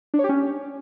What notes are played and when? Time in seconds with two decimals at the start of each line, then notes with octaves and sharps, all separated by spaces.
0.14 D4
0.19 C#5
0.24 G4
0.29 C#4